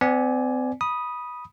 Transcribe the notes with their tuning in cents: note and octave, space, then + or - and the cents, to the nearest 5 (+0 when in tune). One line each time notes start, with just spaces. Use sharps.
C4 -40 D5 +0 G#5 +15
B5 -15 D#6 +0